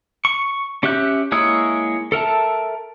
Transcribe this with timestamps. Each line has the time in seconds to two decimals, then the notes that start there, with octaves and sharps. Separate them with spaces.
0.25 C#6
0.83 C#4 G4 E5 F#6 G6
1.32 G#3 A#3 E4 C#5 D#6
2.12 A4 A#4 E5 A5